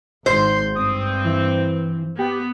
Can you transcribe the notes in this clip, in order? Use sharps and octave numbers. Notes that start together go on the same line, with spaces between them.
G#1 C5 C6
G2 C4 D#6
E3
B3 G4